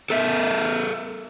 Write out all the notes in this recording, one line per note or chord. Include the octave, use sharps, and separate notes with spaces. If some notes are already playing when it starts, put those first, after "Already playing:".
A4 A#4 E5